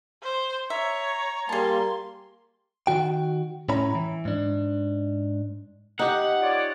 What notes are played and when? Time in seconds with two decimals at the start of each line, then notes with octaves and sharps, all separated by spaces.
0.23 C5
0.70 C#5 E5 A#5
1.49 G3 A#3 G#4 A5 C6
2.87 D#3 F#4 G5
3.69 A2 A3 C#4 C#5 A#5 B5
3.95 E3
4.25 G#2 D4
5.99 D#4 G4 F#5
6.41 F4 C#5 D5